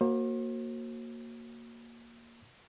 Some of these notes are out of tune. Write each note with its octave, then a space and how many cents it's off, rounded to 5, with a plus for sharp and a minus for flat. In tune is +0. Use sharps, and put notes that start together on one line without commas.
A#3 +0 F#4 -5 C5 +45